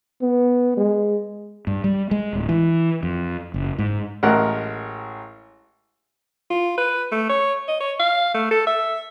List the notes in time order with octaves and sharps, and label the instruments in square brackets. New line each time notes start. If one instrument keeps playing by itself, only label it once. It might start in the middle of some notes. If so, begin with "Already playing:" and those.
[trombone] B3
G#3
[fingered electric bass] G2
G3
G#3
D1
E3
F2
F#1
G#2
[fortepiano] A1 G#3 A#4 F#5
[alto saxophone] F4
B4
A3
C#5
D#5
C#5
F5
A3
A4
E5